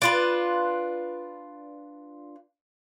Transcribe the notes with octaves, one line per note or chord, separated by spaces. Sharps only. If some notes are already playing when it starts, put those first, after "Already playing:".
D4 F4 B4